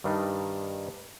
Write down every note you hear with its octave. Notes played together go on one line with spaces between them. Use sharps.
G2 D#3 G3 D4 D#4